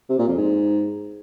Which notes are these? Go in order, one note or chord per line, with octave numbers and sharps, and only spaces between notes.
C3
A#2
F2
G#2